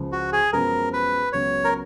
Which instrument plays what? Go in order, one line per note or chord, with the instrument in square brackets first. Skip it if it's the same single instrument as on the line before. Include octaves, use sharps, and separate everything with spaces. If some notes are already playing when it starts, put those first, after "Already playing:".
Already playing: [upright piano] C#2 C#3 F3
[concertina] F#4
G#4
[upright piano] F#2 F3 G#3 B3 F#4 [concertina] A#4
[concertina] B4
[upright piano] C#2 C#3 F#3 B3 [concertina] C#5
[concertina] A#4